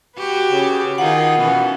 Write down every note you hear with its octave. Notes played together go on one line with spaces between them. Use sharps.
F#4 G4 B4
C#3
D#3 D#4 F4 G#4 F#5
B2 E3 B3 C#4